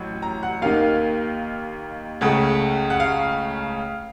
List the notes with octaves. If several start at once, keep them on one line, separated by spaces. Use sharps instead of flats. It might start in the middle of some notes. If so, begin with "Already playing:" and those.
Already playing: A1 A2 F#3
A#5
F#5
D#2 D#3 A#3 D#4 F5
C#2 C#3 A3 F#5
F#5
F5